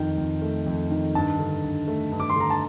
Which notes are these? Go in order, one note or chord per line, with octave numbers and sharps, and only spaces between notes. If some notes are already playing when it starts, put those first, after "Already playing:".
Already playing: F2 D#3 G5
F2
A3
F2
D#3
G2 A5
D3
G2
A3
G2
D6
C6
D3 A#5
A5